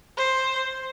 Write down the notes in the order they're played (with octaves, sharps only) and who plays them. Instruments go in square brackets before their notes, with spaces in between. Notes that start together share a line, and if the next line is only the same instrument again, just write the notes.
[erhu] C5